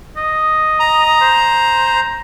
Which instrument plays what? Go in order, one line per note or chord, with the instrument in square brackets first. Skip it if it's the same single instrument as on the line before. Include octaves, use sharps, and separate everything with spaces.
[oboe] D#5
[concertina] A#5
[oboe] C5